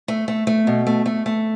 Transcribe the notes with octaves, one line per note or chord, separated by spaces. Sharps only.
A3
A3
A3
B2
A3
A3
A3